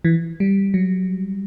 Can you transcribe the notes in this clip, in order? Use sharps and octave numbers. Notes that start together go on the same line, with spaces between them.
E3
G3
F#3